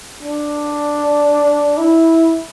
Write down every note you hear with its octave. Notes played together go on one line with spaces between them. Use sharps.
D4
E4